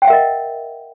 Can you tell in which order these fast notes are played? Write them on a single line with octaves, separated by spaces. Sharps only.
G5 F#5 E5 A#4 D#5